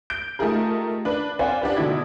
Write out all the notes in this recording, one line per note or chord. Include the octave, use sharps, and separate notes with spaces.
G6 D7
A3 D#4 F4 G4 G#4 A#4
D4 B4
C4 C5 D5 F5 F#5 G#5
D4 G4 B4
B2 D3 D#4 E4 G#6